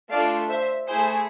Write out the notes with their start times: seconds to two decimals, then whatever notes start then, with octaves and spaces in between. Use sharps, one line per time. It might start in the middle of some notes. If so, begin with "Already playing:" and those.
0.10 A3 D4 F4 A4 D5 F5
0.49 C5 E5
0.88 A3 E4 G#4 C5